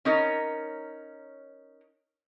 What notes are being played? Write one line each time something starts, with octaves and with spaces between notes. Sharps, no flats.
C#4 D#4 A#4 C#5